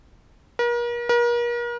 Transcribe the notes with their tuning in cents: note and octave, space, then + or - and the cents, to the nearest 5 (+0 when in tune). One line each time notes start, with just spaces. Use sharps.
A#4 +40
A#4 +40